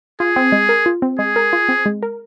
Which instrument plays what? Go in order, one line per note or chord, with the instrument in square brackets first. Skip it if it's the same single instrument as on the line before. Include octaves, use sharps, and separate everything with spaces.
[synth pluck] F4 [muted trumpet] G#4
[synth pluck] C4
G#3
A#4
F4
C4
[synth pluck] G#3 [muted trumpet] G#4
[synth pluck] A#4
F4
C4
G#3
A#4